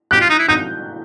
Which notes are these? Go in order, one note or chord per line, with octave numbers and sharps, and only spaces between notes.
G4 F#6
F4
D#4
E4
D#4 G6